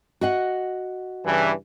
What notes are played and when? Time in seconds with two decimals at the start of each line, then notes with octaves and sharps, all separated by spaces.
0.21 F#4 D#5 F#5
1.25 G2 C#3 E3